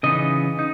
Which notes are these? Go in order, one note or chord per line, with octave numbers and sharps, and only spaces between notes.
C#3 E3 B3 D#4 D#5
D#4